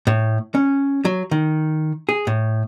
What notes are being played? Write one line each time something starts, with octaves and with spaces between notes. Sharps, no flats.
A2
C#4
F#3
D#3
G#4
A2